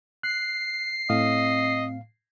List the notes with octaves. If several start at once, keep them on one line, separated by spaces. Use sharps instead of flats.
F#6 C7
A2 C4 D#5 F5